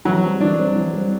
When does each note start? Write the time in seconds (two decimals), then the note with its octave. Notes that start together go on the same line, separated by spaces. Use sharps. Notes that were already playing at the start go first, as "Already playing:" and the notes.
0.05 E3 F#3
0.23 G3 C4
0.40 E3 D4
0.58 G3 C4
0.76 E3
0.93 G3 C4